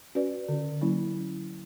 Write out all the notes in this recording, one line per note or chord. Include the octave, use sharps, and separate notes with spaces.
C#4 F#4 B4 D5
D3
F#3 A#3 C#4 E4